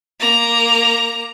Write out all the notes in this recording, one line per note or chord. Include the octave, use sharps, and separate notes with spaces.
A#3 A#5